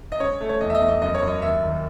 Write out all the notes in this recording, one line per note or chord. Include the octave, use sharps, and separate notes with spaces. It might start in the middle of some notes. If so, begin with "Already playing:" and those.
D#5
C#3 C#5
A3
C#5
E2 D#5
E5
D#5
E2
D#5
F#2 D#5
C#5
F#2
D#5
D#2 E5
D#3